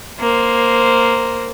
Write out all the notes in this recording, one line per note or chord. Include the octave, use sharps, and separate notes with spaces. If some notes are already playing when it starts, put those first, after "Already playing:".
A#3 C5